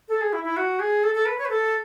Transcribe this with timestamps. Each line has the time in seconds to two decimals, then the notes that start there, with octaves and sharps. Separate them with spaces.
0.08 A4
0.21 G#4
0.33 E4
0.44 E4
0.57 F#4
0.80 G#4
1.03 A4
1.14 A4
1.26 B4
1.38 C#5
1.45 B4
1.50 A4